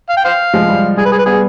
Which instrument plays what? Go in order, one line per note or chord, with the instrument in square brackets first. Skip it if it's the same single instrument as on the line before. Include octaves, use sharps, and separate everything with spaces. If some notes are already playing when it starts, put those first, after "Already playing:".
[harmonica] F5
G5
C5 F5
[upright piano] F3 G#3
G3
[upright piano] G3 [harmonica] G#4
[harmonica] B4
G#4
B4
[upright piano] G3 B3 [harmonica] G#4